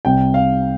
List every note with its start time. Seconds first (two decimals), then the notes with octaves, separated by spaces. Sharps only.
0.05 C2 C3 G3 G5
0.34 F5